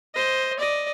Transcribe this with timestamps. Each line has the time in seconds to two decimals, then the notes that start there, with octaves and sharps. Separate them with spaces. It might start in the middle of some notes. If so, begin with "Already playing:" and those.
0.15 C5 D#5
0.59 D5 D#5